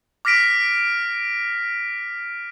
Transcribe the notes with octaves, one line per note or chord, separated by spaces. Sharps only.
D6 F6 A#6 B6 D7